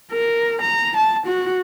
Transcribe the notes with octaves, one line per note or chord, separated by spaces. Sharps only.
A#4
A#5
A5
F#4